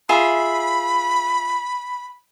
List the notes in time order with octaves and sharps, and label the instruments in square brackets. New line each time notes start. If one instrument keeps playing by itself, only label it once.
[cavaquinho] F4 G#4 E5 [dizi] B5